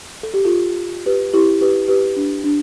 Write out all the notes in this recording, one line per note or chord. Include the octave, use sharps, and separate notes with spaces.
A4
G4
F4 A4
G4 B4
E4 G4
G4 B4
G4 B4
D4
D4